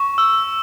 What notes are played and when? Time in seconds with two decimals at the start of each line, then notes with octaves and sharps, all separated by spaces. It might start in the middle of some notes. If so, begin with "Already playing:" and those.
Already playing: C#6
0.18 E6